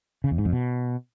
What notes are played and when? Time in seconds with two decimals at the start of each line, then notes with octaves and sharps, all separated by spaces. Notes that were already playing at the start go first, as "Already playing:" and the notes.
0.24 C#3
0.31 E2
0.38 G#2
0.45 F2
0.52 B2